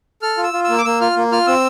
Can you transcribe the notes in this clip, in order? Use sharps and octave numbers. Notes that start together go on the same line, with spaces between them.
A4 F6
F4
E6
F4
E6
A#3
D6
A#3 E6
F4 F6
A#3
F4 F6
C4 E6